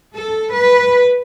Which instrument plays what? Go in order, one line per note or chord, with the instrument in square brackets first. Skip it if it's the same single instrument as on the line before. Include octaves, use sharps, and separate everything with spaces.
[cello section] A4
B4